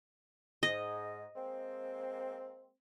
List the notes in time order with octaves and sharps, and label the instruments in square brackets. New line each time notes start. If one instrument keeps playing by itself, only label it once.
[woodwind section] G#2 [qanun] D#5
[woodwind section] G#3 A#3 C4